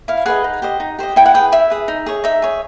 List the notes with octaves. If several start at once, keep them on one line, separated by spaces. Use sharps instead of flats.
E4 F5
G#4 B4 D#5 F#5
D#4
G4 C5 D#5
D#4
G4 C5 D#5
E4 G5
F#5
G#4 B4 G5
E4 E5
G#4 B4
D#4
G#4 C#5
D#4 E5
G#4 C#5